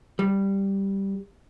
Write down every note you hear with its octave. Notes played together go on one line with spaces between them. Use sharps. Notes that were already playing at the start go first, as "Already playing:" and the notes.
G3